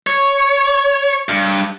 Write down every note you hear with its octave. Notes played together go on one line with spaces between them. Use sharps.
C#5
G2